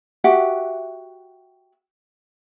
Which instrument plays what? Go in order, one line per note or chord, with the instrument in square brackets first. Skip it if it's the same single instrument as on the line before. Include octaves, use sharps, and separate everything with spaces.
[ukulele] F#4 G4 E5 F#5